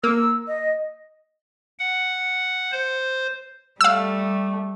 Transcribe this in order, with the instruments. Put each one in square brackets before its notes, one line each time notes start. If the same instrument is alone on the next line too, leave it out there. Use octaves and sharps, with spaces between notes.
[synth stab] A#3 [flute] E6
[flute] D#5
[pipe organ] F#5
C5
[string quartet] G3 A3 [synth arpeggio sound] F5 E6